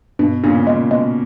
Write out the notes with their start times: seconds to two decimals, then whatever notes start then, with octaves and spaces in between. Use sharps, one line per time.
0.19 G2 B2
0.44 G2 A#2 C#3
0.67 A#2 C#3 G#3
0.91 B2 G#3